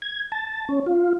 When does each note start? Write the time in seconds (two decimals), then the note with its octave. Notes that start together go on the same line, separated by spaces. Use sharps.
0.02 G#6
0.32 A5
0.69 C#4
0.86 F4